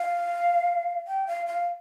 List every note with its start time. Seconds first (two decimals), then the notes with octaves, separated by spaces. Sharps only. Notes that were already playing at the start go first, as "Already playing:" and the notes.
Already playing: F5
1.07 G5
1.27 F5
1.47 F5